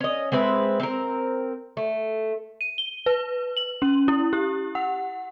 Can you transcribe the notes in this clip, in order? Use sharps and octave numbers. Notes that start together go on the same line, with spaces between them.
C#4 D#5
G#3 C4 E4 B4
C4 A#4
A3
D#7
G7
B4
F#7
C#4
E4
G4
F#5